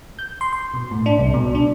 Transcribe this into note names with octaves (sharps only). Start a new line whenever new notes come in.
G6
C6
C6
B2
A2
D4
C2
B2
D4